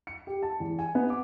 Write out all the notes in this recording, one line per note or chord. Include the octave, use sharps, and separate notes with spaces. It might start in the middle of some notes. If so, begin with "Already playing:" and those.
C#7
G4
A5
E2
G#5
B3
D6